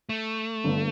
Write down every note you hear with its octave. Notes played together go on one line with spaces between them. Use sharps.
A3
G1 G2 D3